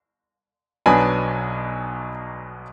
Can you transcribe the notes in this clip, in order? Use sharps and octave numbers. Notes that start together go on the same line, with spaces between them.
B1 B2 F#3 B3 D4 G#5 B5